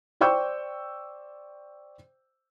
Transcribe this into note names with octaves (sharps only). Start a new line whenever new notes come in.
C5 D5 G5 C#6 E6 G6